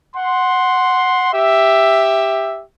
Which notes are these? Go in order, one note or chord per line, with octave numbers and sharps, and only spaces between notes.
F#5 C6
G4 E5